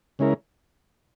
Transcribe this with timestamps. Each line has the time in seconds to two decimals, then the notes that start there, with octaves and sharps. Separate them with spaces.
0.19 C#3 G#3 C#4 E4 A#4